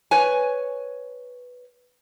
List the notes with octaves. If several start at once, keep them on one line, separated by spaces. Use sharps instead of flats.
B4 C#5 G#5